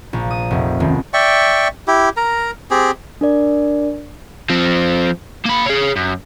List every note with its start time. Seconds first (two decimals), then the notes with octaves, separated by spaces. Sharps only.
0.13 A#1
0.31 D#6
0.50 F1
0.80 D#1
1.14 D5 E5 G5 C#6
1.88 E4 G4
2.17 A#4 A#5
2.71 C4 G4 G#4
3.21 D4 A#4 D5
4.50 F3 C4
5.46 A#3 B5
5.66 G#4 C#5
5.96 F#2